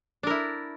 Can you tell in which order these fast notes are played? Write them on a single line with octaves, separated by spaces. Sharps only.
D4 A#4 E4